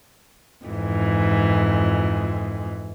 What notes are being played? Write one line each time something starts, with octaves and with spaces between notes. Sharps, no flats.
F2 G#2 E3